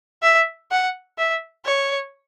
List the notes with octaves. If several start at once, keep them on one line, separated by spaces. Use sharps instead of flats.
E5
F#5
E5
C#5